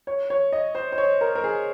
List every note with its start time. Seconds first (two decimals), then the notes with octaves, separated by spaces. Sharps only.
0.07 C#5
0.30 C#5
0.53 D#5
0.75 C5
0.92 C5
0.98 C#5
1.21 A#4
1.35 A#4
1.44 G#4